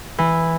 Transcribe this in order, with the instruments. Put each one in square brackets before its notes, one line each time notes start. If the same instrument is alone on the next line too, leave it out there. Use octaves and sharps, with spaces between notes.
[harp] E3